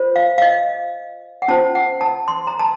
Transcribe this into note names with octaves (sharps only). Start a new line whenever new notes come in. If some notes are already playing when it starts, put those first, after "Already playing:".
Already playing: F4 C5
F5
F5
D#5
F#5
C#4 F4 C5 A5
F#5
A5
C6
A#5
A5